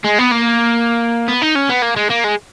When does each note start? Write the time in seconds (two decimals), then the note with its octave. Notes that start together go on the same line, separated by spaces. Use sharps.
0.05 G#3
0.19 B3
0.32 A#3
1.28 B3
1.42 D#4
1.56 C#4
1.70 B3
1.82 A#3
1.96 G#3
2.10 A#3
2.24 G#3